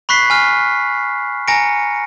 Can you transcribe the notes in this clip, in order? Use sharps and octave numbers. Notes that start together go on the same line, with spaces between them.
B5 C#6 F#6 B6 C7
G#5 F6
G#5 A#5 A#6 C#7 D7